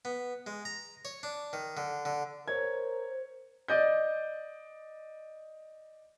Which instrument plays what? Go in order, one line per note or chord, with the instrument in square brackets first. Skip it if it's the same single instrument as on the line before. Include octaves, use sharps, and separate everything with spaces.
[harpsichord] B3
G#3
A#5
C#5
D4
D#3
D3
D3
[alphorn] A#4 [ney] C5 [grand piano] C#5 G#6
[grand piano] D5 D#5 G6